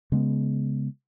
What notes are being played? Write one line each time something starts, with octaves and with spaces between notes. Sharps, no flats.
C#3 G#3 B3